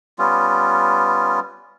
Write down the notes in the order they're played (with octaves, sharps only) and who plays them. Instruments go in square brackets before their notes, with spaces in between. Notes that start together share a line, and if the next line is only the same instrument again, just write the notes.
[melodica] G3 B3 C#4 F4